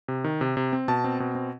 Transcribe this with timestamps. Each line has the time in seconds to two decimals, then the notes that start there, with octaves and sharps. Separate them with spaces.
0.08 C3
0.24 D#3
0.41 C3
0.57 C3
0.73 C4
0.88 B2 A5
1.04 C4
1.20 B2
1.35 C4